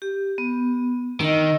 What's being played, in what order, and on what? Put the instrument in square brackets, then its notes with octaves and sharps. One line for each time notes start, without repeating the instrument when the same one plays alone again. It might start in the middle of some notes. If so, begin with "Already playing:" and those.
[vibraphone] G4
B3
[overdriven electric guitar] D#3 [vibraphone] D#5 E6